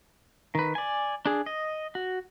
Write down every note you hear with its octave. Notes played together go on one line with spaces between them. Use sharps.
D#3 B4
D5 G#5
D4 G#4
D#5
F#4